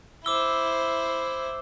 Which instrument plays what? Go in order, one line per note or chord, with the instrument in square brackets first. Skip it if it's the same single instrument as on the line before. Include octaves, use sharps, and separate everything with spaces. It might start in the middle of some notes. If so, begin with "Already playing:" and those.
[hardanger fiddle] E4 C5 [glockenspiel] D6 E6 G7